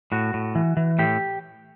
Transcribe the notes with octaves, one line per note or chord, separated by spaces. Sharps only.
A2 F#4
A2
E3
E3
A2 G4